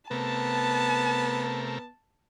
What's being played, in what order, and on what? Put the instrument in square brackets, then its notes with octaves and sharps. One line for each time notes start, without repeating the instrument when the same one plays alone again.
[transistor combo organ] C3 A3 A#4 [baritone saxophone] B3 [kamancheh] A5